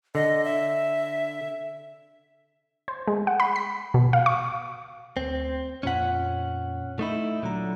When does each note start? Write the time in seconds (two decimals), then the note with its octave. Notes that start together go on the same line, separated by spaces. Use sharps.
0.15 D3 D#5
0.44 E5
2.88 C5
3.08 G#3
3.27 F#5
3.40 B5
3.56 B6
3.94 B2
4.13 F5
4.26 C#6
5.17 D2 C4
5.83 F2 A#2 C#4 F#5 B6
6.99 A3 D#4 E4
7.43 A#2 D3 F#3 A#5